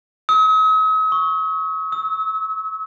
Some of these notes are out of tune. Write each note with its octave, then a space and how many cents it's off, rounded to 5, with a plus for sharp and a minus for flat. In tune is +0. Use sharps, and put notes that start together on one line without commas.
D#6 +45
C#6 +5
E6 -35